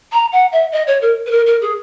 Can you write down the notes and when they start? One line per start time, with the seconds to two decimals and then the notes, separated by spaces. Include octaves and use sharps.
0.12 A#5
0.32 F#5
0.52 E5
0.72 D#5
0.87 C#5
1.01 A#4
1.26 B4
1.31 A#4
1.46 A#4
1.61 G#4